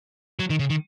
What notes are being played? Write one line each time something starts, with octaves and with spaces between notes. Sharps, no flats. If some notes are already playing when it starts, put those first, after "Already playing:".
F#3
D#3
C#3
D#3